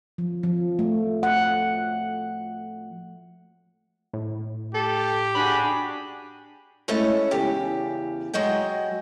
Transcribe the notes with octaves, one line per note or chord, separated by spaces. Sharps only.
F3
F3
A3
F#5
A2
G4 A4
D4 F#4 G#4 B5
G#3 A3 C#4 E4 A4 C#5
E2 C#3 G4
F#3 G#3 F#4 D#5 G5